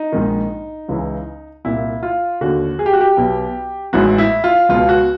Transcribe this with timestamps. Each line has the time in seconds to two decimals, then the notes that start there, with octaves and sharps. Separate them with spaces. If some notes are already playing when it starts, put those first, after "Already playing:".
Already playing: D#4
0.12 A#1 G#2 D#3
0.89 C#2 C#3 E3
1.65 C2 A#2 E4
2.03 F4
2.41 D#2 D3 F#4
2.79 G#4
2.86 G4
2.93 F#4
3.01 G4
3.17 B1 B2
3.93 A1 G#2 E3 F#4
4.18 E4
4.44 F4
4.69 C#2 B2 F4
4.89 F#4